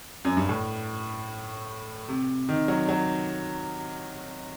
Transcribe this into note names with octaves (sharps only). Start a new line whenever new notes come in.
F#2
G2
A2
C3
D#3
F#3
F#3